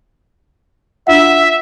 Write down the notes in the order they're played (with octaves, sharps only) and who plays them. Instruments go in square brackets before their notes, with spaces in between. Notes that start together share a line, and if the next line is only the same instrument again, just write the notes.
[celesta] D4 F4 F#5 [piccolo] E5